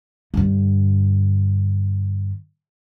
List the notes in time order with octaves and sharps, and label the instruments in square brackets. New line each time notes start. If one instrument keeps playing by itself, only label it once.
[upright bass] G2 D3